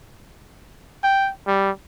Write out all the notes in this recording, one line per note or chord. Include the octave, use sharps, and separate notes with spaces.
G5
G3